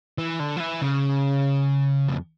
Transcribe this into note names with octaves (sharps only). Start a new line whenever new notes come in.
E3
D3
F3
E3
C#3
F2